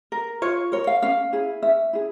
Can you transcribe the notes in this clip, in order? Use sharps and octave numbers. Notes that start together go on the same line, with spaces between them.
A#4
F4 C#5
A#4 C#5
F5
C#4 F5
E4 G#4
C#4 E5
E4 G#4